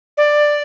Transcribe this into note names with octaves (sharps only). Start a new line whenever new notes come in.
D5